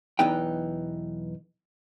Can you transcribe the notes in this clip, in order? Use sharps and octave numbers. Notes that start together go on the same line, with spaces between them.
B1 E2 E3 B3 D#4 G5